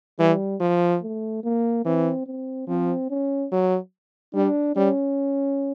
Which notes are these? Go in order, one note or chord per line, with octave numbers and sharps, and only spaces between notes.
E3 G3
F3
A3
A#3
E3 C4
C4
F3 C4
C#4
F#3
G3 D4
G3 C#4